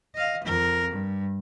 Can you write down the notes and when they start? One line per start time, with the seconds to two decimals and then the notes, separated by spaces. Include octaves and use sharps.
0.15 D#5 F5
0.44 F2 A#4
0.90 G2